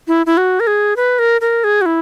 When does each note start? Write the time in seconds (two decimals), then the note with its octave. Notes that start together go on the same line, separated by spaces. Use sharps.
0.08 E4
0.26 E4
0.37 F#4
0.60 A#4
0.67 G#4
0.96 B4
1.19 A#4
1.41 A#4
1.64 G#4
1.81 F#4
1.86 E4